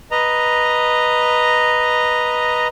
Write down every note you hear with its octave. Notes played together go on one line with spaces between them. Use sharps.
B4 D#5 A#5